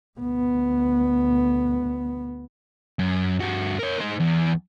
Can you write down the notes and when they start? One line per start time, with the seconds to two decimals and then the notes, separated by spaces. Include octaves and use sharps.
0.19 D2 B3
2.99 F#2
3.40 G2 F#4
3.79 A#4 C#5
4.00 D#4 C5
4.20 E2